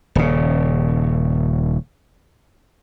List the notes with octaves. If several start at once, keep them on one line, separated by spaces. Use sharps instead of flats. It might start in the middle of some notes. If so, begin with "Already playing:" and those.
D#1 C#3